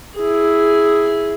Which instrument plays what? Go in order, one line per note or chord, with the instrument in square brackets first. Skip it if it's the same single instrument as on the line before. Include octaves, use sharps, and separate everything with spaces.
[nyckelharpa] E4 G#4